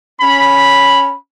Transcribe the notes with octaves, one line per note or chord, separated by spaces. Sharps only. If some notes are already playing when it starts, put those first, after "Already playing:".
C#4 B5